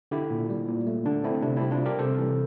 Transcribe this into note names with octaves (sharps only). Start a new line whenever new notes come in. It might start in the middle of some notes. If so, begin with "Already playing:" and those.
D3 E4 G4
A#2
G3
A#2
A3
D3 D4
A3 C4 E4
C3 D4
G3 C4 E4
D4 F4
G3 G4 A#4
C3 A4 C5
E3